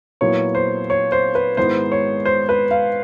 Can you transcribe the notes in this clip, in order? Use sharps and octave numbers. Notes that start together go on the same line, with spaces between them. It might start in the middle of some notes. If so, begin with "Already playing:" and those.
A#2 F#3 B3 E4 C#5
C5
C#5
C5
B4
G#2 D#3 G#3 B3 E4 C5
C#5
C5
B4
F5